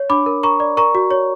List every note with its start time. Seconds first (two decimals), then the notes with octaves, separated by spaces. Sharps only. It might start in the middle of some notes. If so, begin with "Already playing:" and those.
Already playing: C#5
0.10 D4 B5 D6
0.26 A#4
0.43 A#4 A#5 C#6
0.60 D5
0.77 A#4 A#5 C#6
0.95 F#4
1.11 C#5